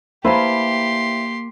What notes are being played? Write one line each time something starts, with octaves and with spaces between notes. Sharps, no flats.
A#3 E4 G4 B4 C5 F5 A5 C6